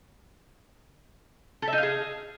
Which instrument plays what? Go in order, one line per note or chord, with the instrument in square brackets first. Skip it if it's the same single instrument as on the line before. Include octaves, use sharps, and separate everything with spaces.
[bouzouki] A4
E5
D#4
F5
G#4